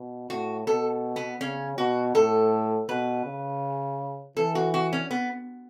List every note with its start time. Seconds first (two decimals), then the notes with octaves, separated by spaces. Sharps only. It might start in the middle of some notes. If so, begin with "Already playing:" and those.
Already playing: B2
0.30 A2 F#4
0.67 B2 A4
1.16 B3
1.40 C#3 C#4
1.78 B2 F#4
2.15 A2 A4
2.89 B2 B4
3.25 C#3
4.37 E3 A4
4.55 F#4
4.74 F#4
4.93 C#4
5.11 B3